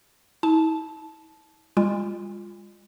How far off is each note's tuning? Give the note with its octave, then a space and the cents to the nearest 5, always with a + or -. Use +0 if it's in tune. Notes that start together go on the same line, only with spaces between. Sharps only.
E4 -45 A5 -15
G#3 -40 F4 +0